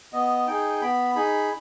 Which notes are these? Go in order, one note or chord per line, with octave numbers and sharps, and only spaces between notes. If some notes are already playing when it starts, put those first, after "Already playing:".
B3 D#5
D#4 G#4 G5
B3 B5
D#4 G#4 B5